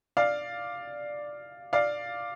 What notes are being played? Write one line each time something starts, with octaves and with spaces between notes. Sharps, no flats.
D5 F5
D5 F5